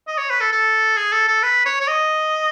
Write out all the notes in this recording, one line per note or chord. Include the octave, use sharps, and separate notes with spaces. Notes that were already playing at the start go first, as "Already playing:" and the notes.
D#5
C#5
B4
A4
A4
G#4
A4
A4
B4
C#5
C#5
D#5